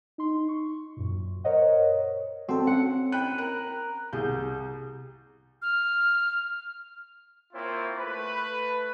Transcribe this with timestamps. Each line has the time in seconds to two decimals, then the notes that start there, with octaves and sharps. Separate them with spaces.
0.18 D#4 C6
0.49 C#6
0.97 F#2 A#2
1.44 A#4 C5 C#5 D#5 F#5
2.49 C4 F#4 A4
2.67 C#4 F#5
3.12 G5 B5 F#6 D#7
3.38 A#4 A#5 F#6
4.13 C2 G#4 G6
5.62 F6
7.53 A#3 C4 E4 F4 C5 C#5
7.97 A3 B4